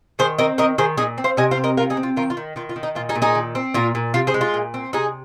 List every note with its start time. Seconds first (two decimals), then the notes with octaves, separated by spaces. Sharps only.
0.19 D#3 G#4 C5
0.38 C4 A#4 D#5
0.58 D#3 A#4 D#5
0.78 D#3 G#4 C5
0.98 A#2 D#4 G#4
1.18 C4
1.24 C5 F5
1.37 C3 D#5 G#5
1.51 C5 F5
1.58 C4
1.64 A#4 D#5
1.77 C3 F4 A#4
1.90 D#4 G#4
1.97 C4
2.03 F4
2.16 D#3 F4 A#4
2.30 F4
2.37 D#3
2.56 D#3 F4
2.69 F4
2.76 D#3
2.83 D#4
2.95 A#2 F4
3.09 D#4 G#4
3.15 A#2
3.22 D#4 G#4
3.35 D#3
3.55 C4
3.74 A#2 F4 A#4
3.95 A#2
4.14 C3 F4
4.27 G#4 C5
4.34 G#3
4.41 F4
4.54 A#2
4.74 C4
4.93 C3 D#4 G#4